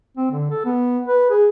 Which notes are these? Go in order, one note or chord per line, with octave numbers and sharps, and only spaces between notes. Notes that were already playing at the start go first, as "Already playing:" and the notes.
C4
D3
A4
B3
B4
G#4